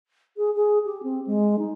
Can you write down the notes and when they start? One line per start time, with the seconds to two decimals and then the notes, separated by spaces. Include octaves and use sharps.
0.37 G#4
0.55 G#4
0.85 G4
1.03 C4
1.26 G#3
1.59 D#4